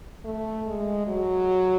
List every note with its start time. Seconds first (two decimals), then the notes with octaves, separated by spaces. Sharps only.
0.25 A3
0.67 G#3
1.07 F#3